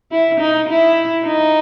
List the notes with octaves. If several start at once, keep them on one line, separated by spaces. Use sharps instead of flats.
E4
D#4
E4
D#4